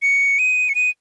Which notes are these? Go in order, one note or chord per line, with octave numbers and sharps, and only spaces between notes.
C#7
D#7
C#7
D#7